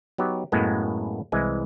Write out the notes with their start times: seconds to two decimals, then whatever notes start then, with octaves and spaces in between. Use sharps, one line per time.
0.18 F#3 B3 D#4 G4
0.52 F#2 A2 G#3 A#3 B3
1.32 C2 E3 G#3 G#5